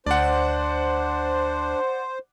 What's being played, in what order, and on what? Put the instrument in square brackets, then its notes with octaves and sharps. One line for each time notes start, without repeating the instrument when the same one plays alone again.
[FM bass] D2 [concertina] D4 [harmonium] C5 [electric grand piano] D5 F#5